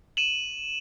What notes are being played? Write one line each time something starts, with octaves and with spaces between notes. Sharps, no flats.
D#7 E7 F#7